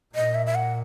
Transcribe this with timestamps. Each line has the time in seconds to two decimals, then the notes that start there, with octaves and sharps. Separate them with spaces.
0.15 A#2 D#5
0.35 E5
0.47 E5
0.55 F#5